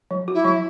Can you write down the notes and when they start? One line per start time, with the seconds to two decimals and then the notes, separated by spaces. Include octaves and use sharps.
0.11 F#3
0.28 F#4
0.34 E4
0.45 F#3